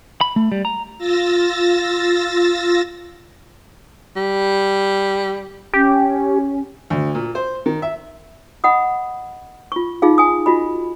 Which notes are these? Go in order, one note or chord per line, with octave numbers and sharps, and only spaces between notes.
B5
A3
G3
A#5
F4 E6 A6 A#6
G3
C#4 G4
D2
A#2
C5
D#3
E5
D#5 F#5 B5 D#6
F4 C#6
D#4 F4 G#4 F5
G#5 D#6
F4 F#4 D#5 B5